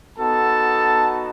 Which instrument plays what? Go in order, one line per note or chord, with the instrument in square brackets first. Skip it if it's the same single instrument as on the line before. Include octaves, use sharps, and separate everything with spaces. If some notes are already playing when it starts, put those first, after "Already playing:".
[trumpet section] B3 D#4 F#4 A4 A5